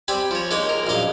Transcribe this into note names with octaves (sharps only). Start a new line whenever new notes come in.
G3 C4 G#5 B5
F3 C#5
G#3 A#3 D#4 C#5
A#4
A#1 F#2 D#5 F5